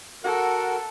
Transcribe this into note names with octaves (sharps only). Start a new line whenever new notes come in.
F#4 A4 A#4 F#5